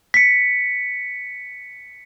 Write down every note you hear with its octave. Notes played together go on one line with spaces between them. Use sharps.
B6 C#7